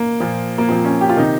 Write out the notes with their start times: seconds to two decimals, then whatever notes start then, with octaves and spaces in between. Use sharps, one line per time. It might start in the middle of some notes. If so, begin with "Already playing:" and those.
Already playing: A#3
0.20 A#2 F3
0.58 A#3
0.69 A#2 F3 C4
0.85 C#4
1.01 G4
1.09 F4
1.17 C3 D#3 D#4